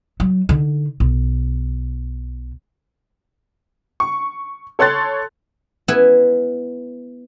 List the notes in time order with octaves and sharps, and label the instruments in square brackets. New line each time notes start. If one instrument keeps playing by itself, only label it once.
[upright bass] F#3
D3 D#4
B1
[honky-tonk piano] C#6
A4 C#5 C6 F#6 A6
[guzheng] B3 E4 B4 E5 G#5